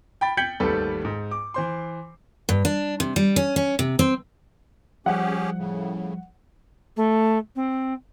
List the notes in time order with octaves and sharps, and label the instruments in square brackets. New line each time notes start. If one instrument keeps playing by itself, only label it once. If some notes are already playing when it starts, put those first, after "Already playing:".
[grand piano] G5 B5 A6
G5 G6 G#6 B6 C#7 F#7
G#1 D#2 G3 A3 A4 B4
G#2
D6
E3 C5 C6
[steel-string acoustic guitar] G2
D4
C3
G3
C#4
C#4
C3
C4
[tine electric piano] F3 G3 [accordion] C#4 G4 G#4 [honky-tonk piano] F#5
[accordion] A2 C#3
[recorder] A3
C4